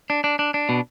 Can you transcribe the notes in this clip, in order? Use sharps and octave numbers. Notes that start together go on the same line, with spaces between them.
D4
D4
D4
D4
B2